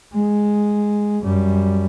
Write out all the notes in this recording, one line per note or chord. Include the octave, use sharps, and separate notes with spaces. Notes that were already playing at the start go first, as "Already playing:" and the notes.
G#3
F#2 G3